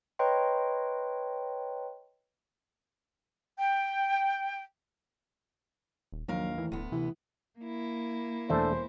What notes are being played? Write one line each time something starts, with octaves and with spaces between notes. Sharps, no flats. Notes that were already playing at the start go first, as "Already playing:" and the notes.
B4 C#5 D#5 G5 A#5 C6
G5
D#1
A#1 D#2 F#3 A#4 F5
A2 E3
D1 D2 B3
C3 E3
A#3 E4
E1 A3 D4 A4 C5